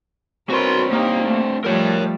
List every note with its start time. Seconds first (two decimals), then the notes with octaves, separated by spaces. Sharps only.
0.50 C4 D4 F#4 A#4 B4 C#5 C6
0.92 A#3 D#4 G4
1.23 A3
1.64 F3 G3 A3 A#4 C#5